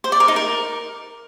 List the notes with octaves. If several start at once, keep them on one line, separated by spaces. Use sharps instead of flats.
C5
D5
A#4
D#4
A#4